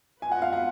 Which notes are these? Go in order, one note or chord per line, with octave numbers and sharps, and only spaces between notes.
B3 F4 B4 G#5
F#5
F5
F#5